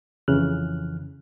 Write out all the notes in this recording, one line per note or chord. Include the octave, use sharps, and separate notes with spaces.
F2 C#3 E3 F6 F#6